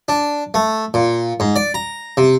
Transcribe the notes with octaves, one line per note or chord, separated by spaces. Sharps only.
D4
A3
A#2
G#2
D5
A#5
C3